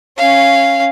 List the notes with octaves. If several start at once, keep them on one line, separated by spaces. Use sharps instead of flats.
C#4 F5